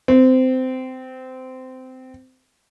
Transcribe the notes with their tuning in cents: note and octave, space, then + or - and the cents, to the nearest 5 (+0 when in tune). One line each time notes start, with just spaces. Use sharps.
C4 -20